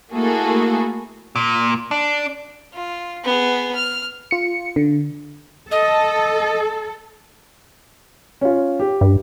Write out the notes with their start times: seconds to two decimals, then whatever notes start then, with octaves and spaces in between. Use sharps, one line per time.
0.12 A3 A#3 E4 F#4 G#4 A4
1.36 A#2
1.91 D4
2.74 F4
3.24 B3 G#4
3.75 F6
4.31 F4 C#7
4.76 D3
5.71 A4 D#5
8.41 C#4 F4
8.80 G4
9.01 G2